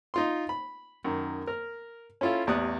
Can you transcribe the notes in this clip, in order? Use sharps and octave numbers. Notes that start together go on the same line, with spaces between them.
D#4 F4 C6
B5
F#2 D#3
A#4 F6
C#4 E4 F4 A4 F5
A1 E2 G4 D5 D#6 F#6